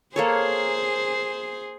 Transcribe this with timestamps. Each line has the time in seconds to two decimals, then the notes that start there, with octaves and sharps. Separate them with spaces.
0.16 A#3 G#4 A4 C5 C#5